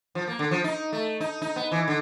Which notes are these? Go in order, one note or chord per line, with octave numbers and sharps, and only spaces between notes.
F3
A#3
D3
F3
D#4
A3
D#4
D#4
B3
E3
D3